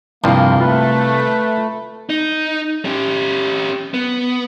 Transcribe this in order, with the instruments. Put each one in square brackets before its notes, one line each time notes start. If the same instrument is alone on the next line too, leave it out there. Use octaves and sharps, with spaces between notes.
[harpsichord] C2 [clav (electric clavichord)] G2 F3 [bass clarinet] A#3
[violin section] A3 [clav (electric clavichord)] F4 [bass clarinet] B4
[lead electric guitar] D#4
C#4 G4
B3